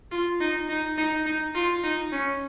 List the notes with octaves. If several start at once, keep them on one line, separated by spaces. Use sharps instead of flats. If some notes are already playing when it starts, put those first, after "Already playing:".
F4
D#4
D#4
D#4
D#4
F4
D#4
C#4